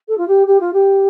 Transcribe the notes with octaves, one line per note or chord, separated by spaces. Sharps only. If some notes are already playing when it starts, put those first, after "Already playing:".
A4
F4
G4
G4
F4
G4